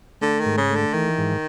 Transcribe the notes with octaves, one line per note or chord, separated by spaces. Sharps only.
D3 A3
D#3
G#2
C#3
A3
D3
D#3 E3
G#2